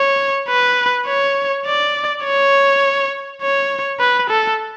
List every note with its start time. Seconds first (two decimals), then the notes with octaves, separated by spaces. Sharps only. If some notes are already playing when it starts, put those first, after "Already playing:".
Already playing: C#5
0.48 B4
1.07 C#5
1.66 D5
2.24 C#5
3.42 C#5
3.99 B4
4.30 A4